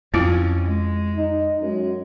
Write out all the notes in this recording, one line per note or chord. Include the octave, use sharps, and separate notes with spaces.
F2 C4 C#4 E4 F4
G#3
D#4
F#2 G#3